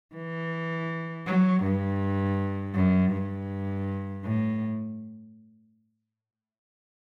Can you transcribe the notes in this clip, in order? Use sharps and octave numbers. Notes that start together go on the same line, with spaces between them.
E3
F#3
G2
F#2
G2
A2